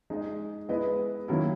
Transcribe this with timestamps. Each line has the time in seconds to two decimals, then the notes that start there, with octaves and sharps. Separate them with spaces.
0.10 G#3 D#4 G#4 D#5
0.69 G#3 B3 E4 B4 D#5
1.28 D#3 F#3 A#3 C#4 E4